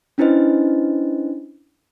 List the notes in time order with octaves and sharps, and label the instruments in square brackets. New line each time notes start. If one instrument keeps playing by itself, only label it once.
[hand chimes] C#4 D4 E4 B4 C5 D#5